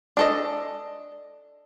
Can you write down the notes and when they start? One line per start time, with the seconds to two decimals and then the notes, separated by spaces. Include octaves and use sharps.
0.17 D4 A4 D#5